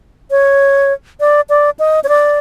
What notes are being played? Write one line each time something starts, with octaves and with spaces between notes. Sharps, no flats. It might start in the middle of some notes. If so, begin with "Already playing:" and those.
C#5
D5
D5
D#5
C#5
D5